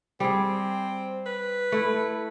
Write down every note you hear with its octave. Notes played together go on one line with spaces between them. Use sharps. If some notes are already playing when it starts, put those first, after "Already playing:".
G3 C4 G#4
B4
A3 E4